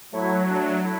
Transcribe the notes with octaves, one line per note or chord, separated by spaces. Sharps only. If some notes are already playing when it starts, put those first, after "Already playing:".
A2 F#3 A3 E4
D3 A3 D4
A3 E4